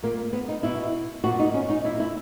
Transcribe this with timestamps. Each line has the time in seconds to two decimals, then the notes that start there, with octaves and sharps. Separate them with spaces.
0.03 A#2 A#3
0.33 B3
0.48 D#4
0.63 B2 E4
1.24 A#2 F#4
1.39 D#4
1.54 C#4
1.70 D#4
1.84 A#2 E4
2.00 E4